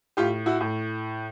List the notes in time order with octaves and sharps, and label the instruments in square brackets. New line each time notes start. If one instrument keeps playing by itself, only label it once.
[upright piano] A2 F4 G4
E4 F#4
A2